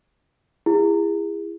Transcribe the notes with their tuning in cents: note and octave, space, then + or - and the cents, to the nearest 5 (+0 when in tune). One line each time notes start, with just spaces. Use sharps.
E4 +25 G#4 -35